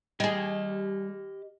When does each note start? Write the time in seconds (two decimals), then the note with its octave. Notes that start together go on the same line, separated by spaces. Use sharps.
0.20 G3 G4 G#4 D#5